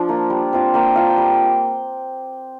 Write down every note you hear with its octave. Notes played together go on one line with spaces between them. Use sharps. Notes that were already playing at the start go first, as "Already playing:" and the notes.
Already playing: F3 D4
A#3 F4
G3
C4 F4
A#3 G5
D4 F4 F5
G5
G3